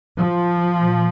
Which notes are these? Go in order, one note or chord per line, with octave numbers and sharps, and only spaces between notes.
F3
A#2